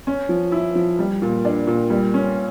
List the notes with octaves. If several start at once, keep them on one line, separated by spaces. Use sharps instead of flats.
C#4
F3
E4
F3
G3
A#2
D4
A#2
G3
C#4